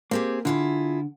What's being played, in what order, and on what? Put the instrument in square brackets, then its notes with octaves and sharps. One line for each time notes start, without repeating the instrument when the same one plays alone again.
[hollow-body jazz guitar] A#3 [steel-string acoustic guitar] C4 G4 G#4
[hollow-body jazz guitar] D3 [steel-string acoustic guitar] E4 F4 G#4